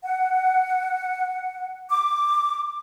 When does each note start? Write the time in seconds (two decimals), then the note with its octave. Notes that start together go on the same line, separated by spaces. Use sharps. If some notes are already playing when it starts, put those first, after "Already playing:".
0.03 F#5
1.90 D6